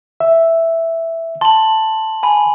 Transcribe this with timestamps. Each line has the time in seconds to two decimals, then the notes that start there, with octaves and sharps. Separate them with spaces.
0.20 E5
1.41 A5 C6 F#7
2.23 G#5 B5